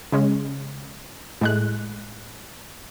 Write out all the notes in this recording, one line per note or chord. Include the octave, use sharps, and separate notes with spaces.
C#3 G#3 C#4
A2 G#3 F#6